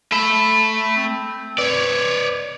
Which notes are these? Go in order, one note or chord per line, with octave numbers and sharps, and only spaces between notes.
A3 E5 B5
C4
B4 C#5 D5